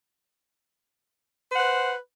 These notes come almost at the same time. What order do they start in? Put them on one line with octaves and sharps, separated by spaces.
C5 F#5 B4